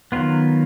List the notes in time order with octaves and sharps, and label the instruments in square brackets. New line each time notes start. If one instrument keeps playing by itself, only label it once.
[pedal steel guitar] D#3 F#3 B3 F4